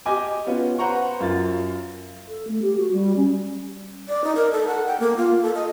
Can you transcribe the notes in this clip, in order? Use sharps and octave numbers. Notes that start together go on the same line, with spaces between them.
G4 D#5 G#5 D6
B3 C#4 F4
B4 C5 F#5 A#5 C#6
F#2 F4 A6
A4
A3
G4
F#4
G3
C#4
D5
D#4
A#4
A4
F#5
G5
A#3
F4
A4
D#5